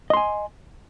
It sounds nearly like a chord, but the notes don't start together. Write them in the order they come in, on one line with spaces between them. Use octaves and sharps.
D#5 C6 G#5